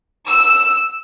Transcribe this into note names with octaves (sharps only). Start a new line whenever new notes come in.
E6